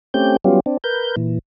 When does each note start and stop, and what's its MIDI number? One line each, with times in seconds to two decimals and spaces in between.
0.14 0.36 57
0.14 0.36 60
0.14 0.36 61
0.14 0.36 67
0.14 0.36 91
0.44 0.60 54
0.44 0.60 55
0.44 0.60 59
0.44 0.60 61
0.44 0.60 65
0.44 0.60 67
0.66 0.77 60
0.66 0.77 62
0.84 1.16 70
0.84 1.16 71
0.84 1.16 91
1.16 1.39 46
1.16 1.39 52